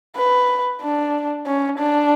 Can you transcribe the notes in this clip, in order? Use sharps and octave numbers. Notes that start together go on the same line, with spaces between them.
B4
D4
C#4
D4